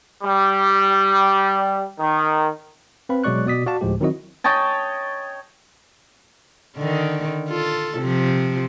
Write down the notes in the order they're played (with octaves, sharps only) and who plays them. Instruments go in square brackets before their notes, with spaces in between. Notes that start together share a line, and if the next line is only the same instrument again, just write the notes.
[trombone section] G3
D#3
[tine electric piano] C4 B4 F5 B5
B2 F#3 G#3 D5 C#6 F#6
B2 D5 D#6 B6
F#4 D5 F5 A5
D2 A2 F3 G#3 G4
D#3 F#3 C4 E4 F#4 D#5
[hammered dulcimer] C#5 D#5 G5 A5
[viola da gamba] D3 D#3
F4 A4
C3 F3